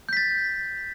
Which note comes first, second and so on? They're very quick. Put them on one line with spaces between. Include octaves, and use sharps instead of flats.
G6 B6 A6